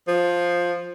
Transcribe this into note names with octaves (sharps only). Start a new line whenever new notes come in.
F3